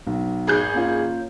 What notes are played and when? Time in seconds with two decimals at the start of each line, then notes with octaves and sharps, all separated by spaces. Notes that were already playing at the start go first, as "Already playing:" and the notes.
0.07 B1
0.47 G#1 G#4 G6
0.74 A#3 C#4 F4